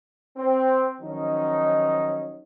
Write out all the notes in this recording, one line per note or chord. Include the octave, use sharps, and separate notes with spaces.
C4
D#3 F3 F#3 C#4 D#4